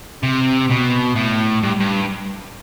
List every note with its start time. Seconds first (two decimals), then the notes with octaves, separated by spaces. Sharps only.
0.23 C3
0.70 B2
1.16 A2
1.63 G2
1.80 G2